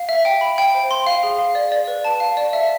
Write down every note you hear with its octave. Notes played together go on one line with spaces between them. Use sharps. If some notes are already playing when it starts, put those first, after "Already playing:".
Already playing: F5
E5
G5
B5
G5
C5
C6
F5
G#4
F5
D5
D5
B4
A5
F5
D5
E5